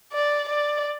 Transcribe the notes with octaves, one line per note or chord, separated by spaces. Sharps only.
D5
D5